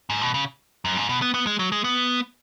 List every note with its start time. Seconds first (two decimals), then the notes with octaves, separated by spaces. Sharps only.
0.10 G#2
0.22 B2
0.34 C#3
0.85 F#2
0.97 G#2
1.09 B2
1.22 B3
1.34 B3
1.47 G#3
1.59 F#3
1.72 G#3
1.84 B3